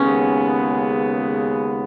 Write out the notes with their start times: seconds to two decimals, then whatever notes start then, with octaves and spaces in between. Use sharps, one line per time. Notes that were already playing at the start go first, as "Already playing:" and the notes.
Already playing: D#2 C#3 G#3 B3 C#4